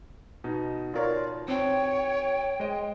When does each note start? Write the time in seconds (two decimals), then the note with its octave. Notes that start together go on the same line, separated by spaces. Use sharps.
0.44 B2 D#4
0.94 F4 A#4 C#5 D5
1.48 C4 C#5 G5
2.60 G#3 C5 D#5